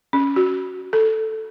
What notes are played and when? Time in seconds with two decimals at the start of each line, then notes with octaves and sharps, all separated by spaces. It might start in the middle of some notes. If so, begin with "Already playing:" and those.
0.13 C#4
0.36 F#4
0.93 A4